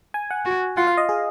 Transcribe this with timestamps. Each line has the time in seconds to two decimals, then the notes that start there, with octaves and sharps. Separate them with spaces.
0.14 G#5
0.31 F#5
0.46 F#4
0.77 F4 F#5
0.87 F5
0.97 D#5
1.09 G#4